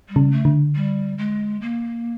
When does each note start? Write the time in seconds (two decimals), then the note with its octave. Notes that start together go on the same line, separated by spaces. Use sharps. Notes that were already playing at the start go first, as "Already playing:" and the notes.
0.08 G3
0.16 C#3
0.31 A3
0.45 D3
0.75 G3
1.18 G#3
1.61 A#3